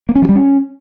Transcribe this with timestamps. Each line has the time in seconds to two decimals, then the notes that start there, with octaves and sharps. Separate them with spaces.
0.09 A#3
0.15 C#4
0.22 F3
0.29 G3
0.36 C#4